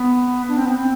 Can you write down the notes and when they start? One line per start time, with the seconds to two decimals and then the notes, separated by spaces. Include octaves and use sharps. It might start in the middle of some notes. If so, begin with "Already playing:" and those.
Already playing: B3
0.48 D4
0.57 C4
0.65 B3
0.75 C4